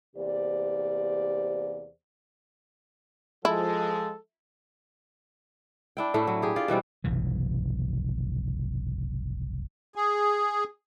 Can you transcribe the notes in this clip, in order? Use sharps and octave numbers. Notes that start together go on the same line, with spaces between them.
E2 C3 A#3 G4 C5 D5
F3 G#3 E4 A4
D4 E4 G5
A2 A3 E4
F#3
G4 G#4
F4 D5
B2 E3 G3 C4
F1 B1 G2 E3
G#4